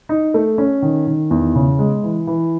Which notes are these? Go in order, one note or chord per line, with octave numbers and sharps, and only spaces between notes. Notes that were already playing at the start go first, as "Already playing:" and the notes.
D#4
A3
C#4
D#3
D#3
E2
C#3
G#3
E3
E3